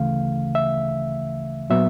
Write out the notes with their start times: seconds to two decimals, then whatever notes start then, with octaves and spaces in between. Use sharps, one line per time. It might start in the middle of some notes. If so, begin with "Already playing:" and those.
Already playing: D2 C#3 E3 A3 F5
0.55 E5
1.70 A#2 F#3 B3 E5